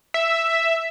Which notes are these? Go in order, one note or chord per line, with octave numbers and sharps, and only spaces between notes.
E5